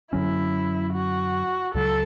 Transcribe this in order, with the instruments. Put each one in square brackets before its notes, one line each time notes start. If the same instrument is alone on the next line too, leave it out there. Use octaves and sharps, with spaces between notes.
[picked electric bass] F#2 D3 F#3 C#4 [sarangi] E4
[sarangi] F#4
[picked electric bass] C#2 C#3 F#3 [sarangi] A4